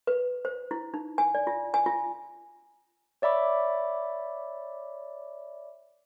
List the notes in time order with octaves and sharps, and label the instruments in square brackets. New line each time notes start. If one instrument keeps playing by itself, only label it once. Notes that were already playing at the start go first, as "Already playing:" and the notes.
[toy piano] B4
C5
E4
D#4
G#5
D5
F4
G#5
F4
[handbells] C#5 D5 E5 B5 D6